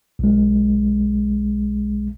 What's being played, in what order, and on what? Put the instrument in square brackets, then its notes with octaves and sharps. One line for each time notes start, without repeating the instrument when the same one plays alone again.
[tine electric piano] B1 G#3